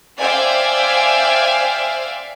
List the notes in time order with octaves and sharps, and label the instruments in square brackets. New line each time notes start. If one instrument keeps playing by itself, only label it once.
[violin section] C5 D5 E5 F5 G5 G#5